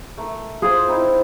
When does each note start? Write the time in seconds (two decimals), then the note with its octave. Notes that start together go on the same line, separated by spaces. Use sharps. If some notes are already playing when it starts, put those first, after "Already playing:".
0.17 A3 A#4
0.62 F4 G#4 C5
0.87 C4 D#4 E4